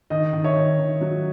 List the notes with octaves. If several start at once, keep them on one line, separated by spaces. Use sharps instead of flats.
D#3 D#5
D#3
C#5 E5
D#3
D#3
F#3